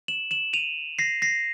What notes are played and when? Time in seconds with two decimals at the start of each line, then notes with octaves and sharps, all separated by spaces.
0.08 E7 F#7
0.31 E7 F#7
0.53 D#7 F7
0.99 A#6 C7
1.22 A#6 C7